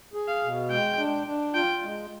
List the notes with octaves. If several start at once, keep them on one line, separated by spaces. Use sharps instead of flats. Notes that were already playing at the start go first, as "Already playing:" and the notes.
G#4
F5
B2
G#3 G5
D4
D4
F4 G5
G#3